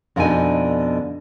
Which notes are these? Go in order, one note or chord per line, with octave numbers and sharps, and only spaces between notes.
F2 B2 D3 D4 D#4 G#5